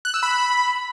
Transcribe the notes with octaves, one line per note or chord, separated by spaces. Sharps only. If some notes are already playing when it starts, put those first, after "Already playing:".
F#6
E6
B5